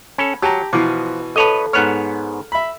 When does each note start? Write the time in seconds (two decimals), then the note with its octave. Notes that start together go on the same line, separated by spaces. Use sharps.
0.18 C#4 A4 B5
0.42 F#3 G4 A5 A#5
0.73 B2 E3 F3 E4 D6
1.36 A4 B4 C#5 D#5 F5 A5
1.73 G#2 B3 C#5 F6 F#6
2.52 E5 B5